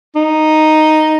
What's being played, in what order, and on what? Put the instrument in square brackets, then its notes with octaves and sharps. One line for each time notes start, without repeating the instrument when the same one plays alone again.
[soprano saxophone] D#4